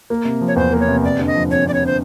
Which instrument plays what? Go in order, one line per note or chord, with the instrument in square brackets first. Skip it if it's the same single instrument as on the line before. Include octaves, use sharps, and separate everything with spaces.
[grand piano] A#3
C3
F3
[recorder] C#5
[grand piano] E2 [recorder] C5
[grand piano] A#3
[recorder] C#5
[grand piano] C3
[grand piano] F2 [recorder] D5
[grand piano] D3
[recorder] D#5
[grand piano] F3
[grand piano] F2 [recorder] C#5
[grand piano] F2 [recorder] D5
[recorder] C#5
[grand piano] D3 [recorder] C5